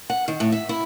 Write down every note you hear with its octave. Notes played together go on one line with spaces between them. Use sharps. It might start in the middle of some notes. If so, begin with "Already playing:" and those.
F#5
D#3
A2
E5
E4